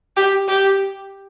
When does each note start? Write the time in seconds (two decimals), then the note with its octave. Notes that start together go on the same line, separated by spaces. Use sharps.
0.17 G4
0.48 G4